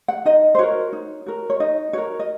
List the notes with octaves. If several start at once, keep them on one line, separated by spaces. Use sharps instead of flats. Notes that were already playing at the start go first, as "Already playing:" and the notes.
F#5
D#4 D#5
C5
F#4 A#4 C#5
D#4
F#4 A#4
C#5
D#4 D#5
F#4 A#4 C#5
D#5